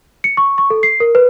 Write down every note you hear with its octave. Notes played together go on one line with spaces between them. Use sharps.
C#7
C#6
C#6
A4
C7
A#4
B4